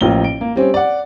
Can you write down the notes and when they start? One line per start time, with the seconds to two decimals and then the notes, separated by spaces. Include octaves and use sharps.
0.01 A1 A2 F3 A#3 G7
0.24 D7
0.41 A#3
0.56 G3 C4 C#4
0.74 D5 F#5